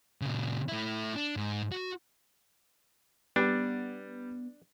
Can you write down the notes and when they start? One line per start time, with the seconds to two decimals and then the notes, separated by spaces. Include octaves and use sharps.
0.21 A#2 C#3
0.68 A3 E4
1.16 D4
1.36 G#2
1.72 F#4
3.36 G3 B3 D4